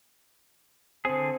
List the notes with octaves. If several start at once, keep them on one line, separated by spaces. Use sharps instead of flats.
D3 C4 G#4